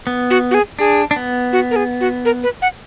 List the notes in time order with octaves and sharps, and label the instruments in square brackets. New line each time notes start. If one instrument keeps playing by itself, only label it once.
[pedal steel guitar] B3
[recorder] F#4
F#4
G#4
[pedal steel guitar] D4 [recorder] G#4
[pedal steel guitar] D4
B3
[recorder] F#4
A#4
G#4
F#4
A#4
B4
F#5